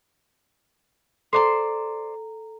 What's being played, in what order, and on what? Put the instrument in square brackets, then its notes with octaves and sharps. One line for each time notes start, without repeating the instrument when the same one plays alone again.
[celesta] A4 A#5 [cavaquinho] C5 D5 C6